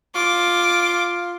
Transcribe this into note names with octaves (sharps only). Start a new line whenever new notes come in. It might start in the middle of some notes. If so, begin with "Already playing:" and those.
F4 D6